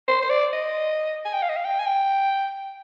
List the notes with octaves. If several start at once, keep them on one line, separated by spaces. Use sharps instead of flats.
C5
C5
D5
D#5
G#5
G5
F5
D#5
F5
G5
G#5
G5